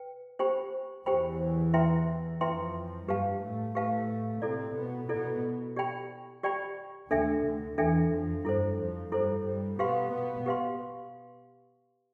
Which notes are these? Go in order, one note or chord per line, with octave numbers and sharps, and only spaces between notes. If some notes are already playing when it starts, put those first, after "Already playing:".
Already playing: B4 G5
G4 C5 G5 B5
E2 E3 G4 C5 G5 B5
E4 B4 E5 G5 C6
F2 F3 E4 B4 E5 G5 C6
G2 G3 G4 B4 F5 A5
A2 A3
A2 A3 G4 B4 F5 A5
C3 C4 E4 A4 D5
B2 B3
B2 B3 E4 A4 D5
G4 D5 G5 B5
G4 D5 G5 B5
D2 D3 D4 A4 E5 G5
D2 D3
E2 E3 D4 A4 E5 G5
F2 F3
G2 G3 E4 A4 C5
F2 F3
G2 G3 E4 A4 C5
G2 G3
B2 B3 G4 B4 F5 C6
B2 B3
G4 B4 F5 C6